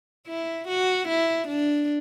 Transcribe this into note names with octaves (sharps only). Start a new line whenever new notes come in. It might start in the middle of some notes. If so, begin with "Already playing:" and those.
E4
F#4
E4
D4